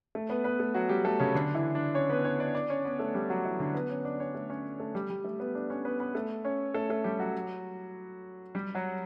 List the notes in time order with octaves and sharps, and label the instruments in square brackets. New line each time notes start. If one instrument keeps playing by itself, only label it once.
[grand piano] A3 A4
B3 B4
B3 B4
A3 A4
F#3 F#4
G3 G4
A3 A4
C#3 C#4
D3 D4
E3 E4
D4 D5
C#4 C#5
B3 B4
C#4 C#5
D4 D5
D4 D5
C#4 C#5
B3 B4
A3 A4
G3 G4
F#3 F#4
E3 E4
D3 D4
B3 B4
C#4 C#5
D4 D5
C#4 C#5
A3 A4
C#4 C#5
A3 A4
G3 G4
G3 G4
A3 A4
B3 B4
D4 D5
C#4 C#5
B3 B4
B3 B4
A3 A4
C#4 C#5
A3 A4
A3 A4
G3 G4
F#3 F#4
G3 G4
F#3 F#4